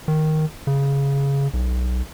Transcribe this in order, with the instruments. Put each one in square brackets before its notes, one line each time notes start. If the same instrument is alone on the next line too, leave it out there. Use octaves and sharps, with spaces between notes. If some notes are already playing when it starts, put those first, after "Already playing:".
[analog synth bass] D#3
C#3
B1